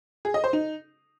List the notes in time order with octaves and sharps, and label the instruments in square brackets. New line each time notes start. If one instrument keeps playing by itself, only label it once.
[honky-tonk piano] G#4
D#5
C5
D#4